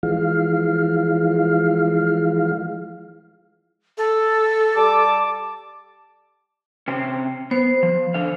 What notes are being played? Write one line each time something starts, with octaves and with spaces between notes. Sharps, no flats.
E3 F3 G#3 F5
A4
G3 A5 D6
C3 C4 C#4
B3 C5
F3
D3 F5